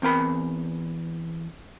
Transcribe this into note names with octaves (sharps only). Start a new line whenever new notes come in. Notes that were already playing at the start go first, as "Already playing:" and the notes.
E2 C4 A#4 B5